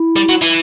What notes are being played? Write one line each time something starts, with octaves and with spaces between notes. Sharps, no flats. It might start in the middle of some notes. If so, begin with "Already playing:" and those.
Already playing: E4
G3
F#3
E3